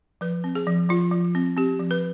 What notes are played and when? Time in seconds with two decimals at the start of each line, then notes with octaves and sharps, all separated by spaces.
0.21 F3 B4
0.44 C4
0.55 G#4
0.67 F3
0.89 F3 F4
1.12 F3
1.35 C4
1.57 C4 G4
1.80 F3
1.91 B4